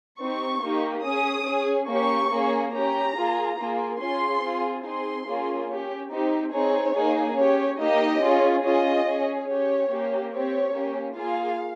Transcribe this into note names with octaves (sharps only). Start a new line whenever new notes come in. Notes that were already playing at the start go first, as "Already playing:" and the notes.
C4 D#4 G4 C#6
A#3 D#4 G4
C#4 G#4 D#6
C#4 G#4
A#3 C#4 G4 C#6
A#3 C#4 G#4
C#4 G4 A#5
A#3 F4 G#4
A#3 F4 G#4
C#4 F4 G#4 C6
C4 F4 G#4
C4 D#4 G#4 C6
A#3 C#4 F4 G#4
C#4 G4
C4 D#4 G4
C4 D#4 G#4 C#5
A#3 D#4 G#4
C#4 G4 C#5
A#3 D#4 G4 D#5
C#4 F4 G#4
C#4 F4 G#4 D#5
C#4 G#4
C#4 G4 C#5
A#3 C#4 G4
C4 G4 C#5
A#3 C#4 G4
A#3 F4 G#4 F5